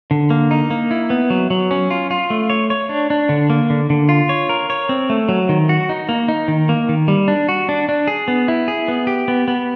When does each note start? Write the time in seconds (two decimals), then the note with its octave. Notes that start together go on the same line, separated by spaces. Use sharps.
0.11 D3
0.30 A#3
0.51 D#4
0.70 A#3
0.91 E4
1.10 B3
1.30 F#3
1.50 F#3
1.71 C#4
1.91 F4
2.11 F4
2.30 A3
2.50 C#5
2.70 C#5
2.89 D4
3.10 D4
3.29 D3
3.50 A#3
3.70 D3
3.90 D3
4.09 F4
4.29 C#5
4.49 A#4
4.70 C#5
4.89 C4
5.10 A3
5.29 F#3
5.49 D#3
5.69 F#4
5.89 D#4
6.09 A#3
6.28 D#4
6.48 D#3
6.69 A#3
6.89 D#3
7.08 G3
7.28 D4
7.49 F#4
7.69 D4
7.89 D4
8.07 G#4
8.28 B3
8.48 E4
8.68 G#4
8.88 B3
9.07 G4
9.28 B3
9.48 B3